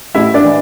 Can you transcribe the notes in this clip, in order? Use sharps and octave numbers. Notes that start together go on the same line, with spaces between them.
A1 E4 E5
D4 D5
E3